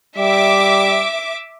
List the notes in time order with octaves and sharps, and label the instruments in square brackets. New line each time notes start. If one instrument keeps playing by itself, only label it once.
[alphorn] G3 [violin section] E5 D6